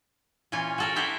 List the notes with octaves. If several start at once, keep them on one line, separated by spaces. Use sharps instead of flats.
A#2 E3 C#4 F4 G#5
F#4 A4 A#4
E4 F#4 G4 A#4 C5 E5